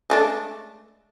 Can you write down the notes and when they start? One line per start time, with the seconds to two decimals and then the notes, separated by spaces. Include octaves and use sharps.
0.10 G#3 A3 D4